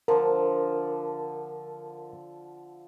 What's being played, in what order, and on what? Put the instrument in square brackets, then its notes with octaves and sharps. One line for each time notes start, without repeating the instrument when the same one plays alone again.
[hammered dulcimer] D3 F3 [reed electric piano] A#4